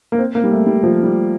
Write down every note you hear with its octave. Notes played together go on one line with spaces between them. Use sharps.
A#3
C4
A#3
G3
A3
G3
F3
G3